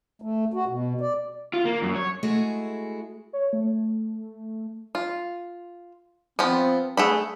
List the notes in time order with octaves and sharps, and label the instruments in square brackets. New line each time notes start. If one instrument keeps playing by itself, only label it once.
[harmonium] A3
F#4
B2
D5
[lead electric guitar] F4
A#3
F#2
C#5
[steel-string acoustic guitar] G#3 A3 E4 F#4 G#4
[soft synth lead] C#5
A3
[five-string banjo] F4
[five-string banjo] F3 B3 [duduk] C4
[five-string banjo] A3 F#5 B5 [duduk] G#4